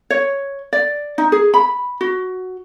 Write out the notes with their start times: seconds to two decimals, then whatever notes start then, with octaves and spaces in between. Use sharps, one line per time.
0.10 C#5
0.73 D5
1.18 D#4
1.32 G#4
1.54 B5
2.01 F#4